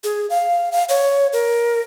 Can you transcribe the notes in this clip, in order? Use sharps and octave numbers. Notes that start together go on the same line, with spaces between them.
G#4
F5
F5
C#5
A#4